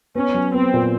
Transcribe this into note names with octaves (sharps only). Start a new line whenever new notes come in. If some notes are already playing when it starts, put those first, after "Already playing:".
B3 C#4
F#3
B3 C4
A#2